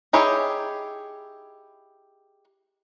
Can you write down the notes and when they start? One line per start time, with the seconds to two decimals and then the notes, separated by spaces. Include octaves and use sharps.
0.13 D#4 E4 G4 G#4 C#5